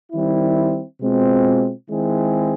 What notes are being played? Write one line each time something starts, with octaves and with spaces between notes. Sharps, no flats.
D#3 G3 C4 E4
B2 G#3 C4 F4
D#3 G#3 C4 E4 G#4